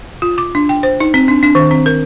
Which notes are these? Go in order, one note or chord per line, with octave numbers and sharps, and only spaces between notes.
F4
D6
D4
G5
C5
D#4
C4
D4
D4
D#3
C4
A#4